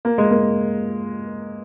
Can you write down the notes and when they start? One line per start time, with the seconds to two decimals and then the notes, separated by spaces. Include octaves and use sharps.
0.05 A#3
0.18 G#3
0.30 A#3